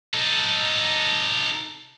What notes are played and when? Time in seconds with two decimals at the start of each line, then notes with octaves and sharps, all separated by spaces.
0.14 D#4 A4